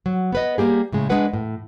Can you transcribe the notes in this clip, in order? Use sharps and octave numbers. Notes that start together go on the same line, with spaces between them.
F#3
B3 B4 D#5
G3 A#3 G4 G#4
A2 C#3 G#3
G#3 D4 G#4 B4 F#5
A2